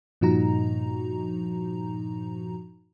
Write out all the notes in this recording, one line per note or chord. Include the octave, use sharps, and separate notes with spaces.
G2 A#2 F3 D#4 F#4 A#5